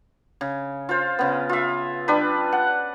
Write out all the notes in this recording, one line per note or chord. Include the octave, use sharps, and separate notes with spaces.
C#3
F4 C5
C#3 B3
F4 E5
G3 D4 B4
F#5